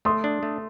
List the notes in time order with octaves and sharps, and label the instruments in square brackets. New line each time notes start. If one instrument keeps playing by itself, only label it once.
[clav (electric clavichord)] A3 [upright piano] C6 D#6
[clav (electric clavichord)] D4
A3